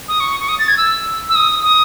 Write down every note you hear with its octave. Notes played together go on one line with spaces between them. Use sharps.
D#6
C#6
C#6
D#6
A6
G#6
E6
E6
D#6
D#6